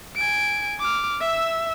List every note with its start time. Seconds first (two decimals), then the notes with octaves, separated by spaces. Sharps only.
0.16 G#5 D7
0.80 D6 F6
1.21 E5 E6